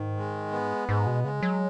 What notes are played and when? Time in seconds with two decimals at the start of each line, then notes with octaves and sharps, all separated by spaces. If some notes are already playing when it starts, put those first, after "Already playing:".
Already playing: G#2 D#3
0.17 G#3
0.52 B3
0.88 G#2 G#3
1.07 B2
1.24 C#3 G#3
1.43 F#3